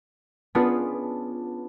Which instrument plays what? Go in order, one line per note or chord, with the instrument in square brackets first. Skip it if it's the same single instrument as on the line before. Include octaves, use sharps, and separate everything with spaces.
[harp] B3 C#4 D4 F4 G#4 B4